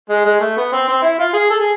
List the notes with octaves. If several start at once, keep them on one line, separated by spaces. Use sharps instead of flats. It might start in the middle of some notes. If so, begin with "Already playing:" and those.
G#3
G#3
A3
B3
C4
C4
E4
F4
G#4
A4
G#4